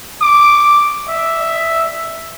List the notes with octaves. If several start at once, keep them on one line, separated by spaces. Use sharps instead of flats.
D6
E5